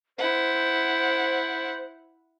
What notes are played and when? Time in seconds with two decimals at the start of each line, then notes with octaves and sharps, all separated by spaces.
0.18 E4 C5 F#5